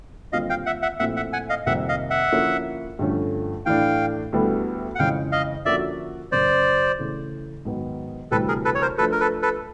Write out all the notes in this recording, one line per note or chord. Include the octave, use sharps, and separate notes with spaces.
D#2 D3 G3 C4 F4 D#5 F5
F5 G5
E5 F#5
E5 F#5
A#2 F3 A3 C4 E4 E5 F#5
E5 F#5
F#5 G#5
D#5 F5
F2 C3 D#3 G3 A#3 E5 F#5
D#5 F5
E5 F#5
D3 F3 A#3 C#4 E4
G2 D3 F3 A3 C#4
A2 E3 A3 D4 F5 G5
D2 D3 G3 B3 E4
F#5
F2 C#3 E3 G#3 F5 G5
D#5 F5
D3 F3 A#3 C#4 F#4 D5 E5
F#2 C#3 F#3 C5 D5
C#3 E3 A3
G#2 D#3 F#3 B3
D2 C3 E3 G3 A4 B4
G#4 A#4
A4 B4
C#5
A#4 C5
F3 A3 D4 A4 B4
A#4
A4 B4
A4 B4